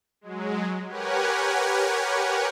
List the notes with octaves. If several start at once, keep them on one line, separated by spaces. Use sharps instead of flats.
F#3 G#3
G4 A#4 B4 C#5 F#5 G#5